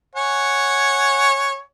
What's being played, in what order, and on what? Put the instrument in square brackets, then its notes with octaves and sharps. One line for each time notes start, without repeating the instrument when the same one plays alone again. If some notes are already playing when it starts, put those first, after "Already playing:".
[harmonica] C#5 F#5 G#5